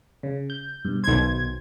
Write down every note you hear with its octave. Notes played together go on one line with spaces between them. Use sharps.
C#3
G6
G2 B2
B1 D#3 C5 G#6